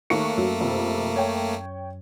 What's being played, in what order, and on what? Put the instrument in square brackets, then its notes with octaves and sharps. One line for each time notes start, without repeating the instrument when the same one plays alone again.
[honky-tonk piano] D#2 C#6 C#7 [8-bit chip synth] A3 A#3
[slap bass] F#2 C#4 [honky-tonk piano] F#3
[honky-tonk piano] F2 C3
C#5 G5